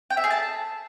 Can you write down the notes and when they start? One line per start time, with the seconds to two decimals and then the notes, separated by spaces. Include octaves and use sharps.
0.10 G5
0.17 E5
0.24 G#4
0.30 A5